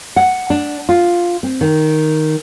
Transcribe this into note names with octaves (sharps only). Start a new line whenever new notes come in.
F#5
D4
F4
C4
D#3